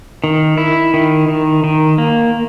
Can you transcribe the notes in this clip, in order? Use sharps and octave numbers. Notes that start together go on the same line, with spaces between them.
D#3
E4
D#3
D#3
D#3
A#3